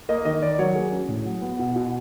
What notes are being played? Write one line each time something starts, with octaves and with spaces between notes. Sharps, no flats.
A#3 D#5
D#3 D#5
D#3 D5
F#3 C#5
A#3 G#4
C#4
A2
F#3
B3
B2
B2